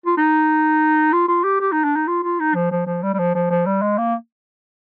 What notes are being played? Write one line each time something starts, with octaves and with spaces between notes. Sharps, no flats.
F4
D#4
F4
F4
G4
G4
D#4
D4
D#4
F4
F4
D#4
F3
F3
F3
G3
G3
F3
F3
F3
G3
G#3
A#3